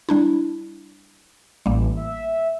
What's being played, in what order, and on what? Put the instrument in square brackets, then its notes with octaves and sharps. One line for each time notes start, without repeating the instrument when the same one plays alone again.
[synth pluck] G3 D4 E4
[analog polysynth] A1 [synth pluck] G3 A#3
[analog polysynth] E5